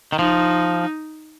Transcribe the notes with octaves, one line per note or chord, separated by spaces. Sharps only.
D#3
F3 D#4